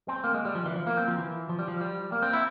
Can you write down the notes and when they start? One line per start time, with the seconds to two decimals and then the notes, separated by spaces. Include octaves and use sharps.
0.08 C4
0.24 A#3
0.34 G#3
0.45 G3
0.55 F3
0.66 E3
0.76 F3
0.87 A#3
0.97 C4
1.08 F3
1.18 E3
1.49 F3
1.59 G3
1.68 F3
1.81 G3
2.12 A#3
2.22 C4
2.33 E4